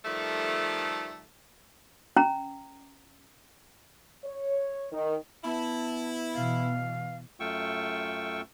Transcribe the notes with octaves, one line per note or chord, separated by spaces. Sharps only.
D#3 F3 G3 A3
C#4 A#5
C#5
D#3
B3 E4 A5
B2 E3 F5
F#2 A3 F4 G5 C#6 E6